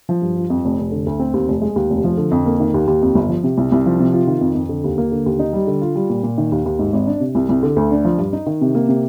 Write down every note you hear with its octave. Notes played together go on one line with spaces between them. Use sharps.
F3
G2
F4
F2
F1
F1
D3
D2
C4
D#2
F1
G#3
D#2
F1
F3
D3
F2
A#3
D#3
D#2
D#2
F2
G1
F3
C3
C2
C2
F3
C3
F4
D#3
F2
F2
D3
D#2
A#3
D3
D#2
D#4
G3
D3
F4
G3
A#2
A#2
D#3
D#2
D#2
G#2
G#1
D4
C3
C2
C2
D3
D2
D4
F3
G2
D#4
D#3
C3
A#3
C3